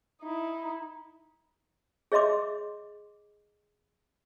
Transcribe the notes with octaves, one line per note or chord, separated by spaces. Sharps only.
D#4 E4
G#4 C#5 D#5 E5 C6 D6